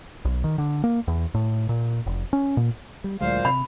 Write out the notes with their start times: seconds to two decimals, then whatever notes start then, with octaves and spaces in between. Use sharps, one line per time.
0.25 B1
0.44 D#3
0.58 D3
0.84 A#3
1.08 E2
1.34 A2
1.69 A#2
2.06 F1
2.33 C#4
2.57 A#2
3.04 G3
3.21 D2 A#2 F#3 G#3 C5 F5
3.45 C3 B5